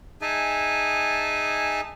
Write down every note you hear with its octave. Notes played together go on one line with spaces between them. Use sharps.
D#4 G#4 E5 G#5 A5